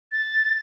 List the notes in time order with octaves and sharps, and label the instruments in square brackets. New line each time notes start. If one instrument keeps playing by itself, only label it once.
[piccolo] A6